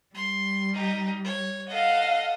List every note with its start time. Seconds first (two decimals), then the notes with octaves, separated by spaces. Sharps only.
0.14 G3 C6
0.73 D#4 G4
1.24 C#5
1.68 A4 D#5 F5 F#5